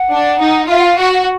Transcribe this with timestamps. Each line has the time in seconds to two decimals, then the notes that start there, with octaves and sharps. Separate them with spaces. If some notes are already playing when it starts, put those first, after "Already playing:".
Already playing: F#5
0.12 D4
0.41 D#4
0.70 F4 E5
0.78 F#5
0.84 F5
0.99 F#4 F#5
1.13 F#5